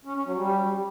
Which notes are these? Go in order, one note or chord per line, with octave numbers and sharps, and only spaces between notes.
C#4
C#4
F#3
G3